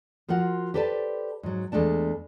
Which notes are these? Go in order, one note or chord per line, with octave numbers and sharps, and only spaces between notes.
F3 F4 F#4 A#4 F#5
G4 A4 B4 C5 D5 A5
G#2 F#3
E2 G#3 A3 D4 A5